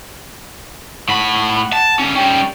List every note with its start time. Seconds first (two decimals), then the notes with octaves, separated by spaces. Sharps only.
1.08 A2 F#5 B5
1.73 A5
1.99 D3 C#4
2.16 G3 C#4 G5